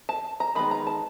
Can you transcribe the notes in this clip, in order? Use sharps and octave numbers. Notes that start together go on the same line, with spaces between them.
A5
A#5
D#3 G#3 B3 B5
A#5
A5